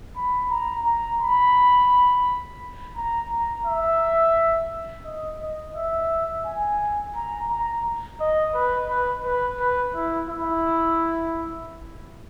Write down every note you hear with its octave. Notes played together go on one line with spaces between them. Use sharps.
B5
A#5
A#5
B5
A#5
A#5
E5
D#5
D#5
E5
G#5
A#5
A#5
D#5
B4
B4
B4
B4
E4
E4